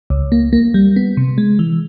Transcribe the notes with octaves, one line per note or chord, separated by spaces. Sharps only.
C#2
A#3
A#3
G3
B3
C3
G#3
E3